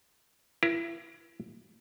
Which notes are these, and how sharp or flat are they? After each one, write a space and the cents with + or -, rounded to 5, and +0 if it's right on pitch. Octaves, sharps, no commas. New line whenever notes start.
E4 +30 A#4 +45